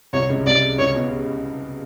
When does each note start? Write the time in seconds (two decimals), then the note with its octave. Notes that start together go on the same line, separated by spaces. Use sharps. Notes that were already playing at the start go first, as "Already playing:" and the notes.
0.13 C2 C3 C#5
0.29 C#2 C#3
0.46 C2 C3 D5
0.79 C#2 C#3 C#5
0.95 B2